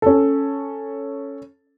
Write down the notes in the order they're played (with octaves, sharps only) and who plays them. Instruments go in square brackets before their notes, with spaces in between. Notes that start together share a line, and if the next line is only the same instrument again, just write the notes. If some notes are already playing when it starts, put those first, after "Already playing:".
[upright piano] C#4 A4